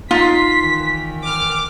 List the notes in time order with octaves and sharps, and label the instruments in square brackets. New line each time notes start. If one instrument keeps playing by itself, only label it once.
[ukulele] D#4 F4 [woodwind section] C6 [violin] B6
[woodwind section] D#3 E3
[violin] D6 F6